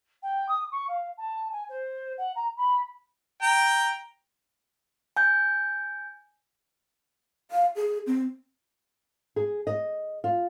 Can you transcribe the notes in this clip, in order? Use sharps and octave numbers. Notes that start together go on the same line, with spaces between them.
G5
D#6
C#6
F5
A5
G#5
C5
F#5
A#5
B5
G5 A#5
G#5 G6
F5
G#4
C4
G#4
D#5
F4